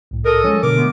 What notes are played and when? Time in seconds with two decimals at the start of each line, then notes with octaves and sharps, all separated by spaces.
0.11 C2 A2
0.25 A4 A#4 D#5
0.44 F3 G#3 C#4
0.63 B2 D3 A#4 D6
0.75 G#3 A3 B3